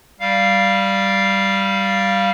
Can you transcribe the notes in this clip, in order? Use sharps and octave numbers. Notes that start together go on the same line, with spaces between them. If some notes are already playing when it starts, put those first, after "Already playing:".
G3 F5